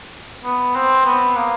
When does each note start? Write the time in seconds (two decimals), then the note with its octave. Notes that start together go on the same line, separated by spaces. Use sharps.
0.44 B3
0.75 C4
1.05 B3
1.36 A#3